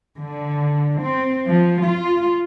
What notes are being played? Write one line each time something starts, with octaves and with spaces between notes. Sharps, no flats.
D3
C4
F3
F4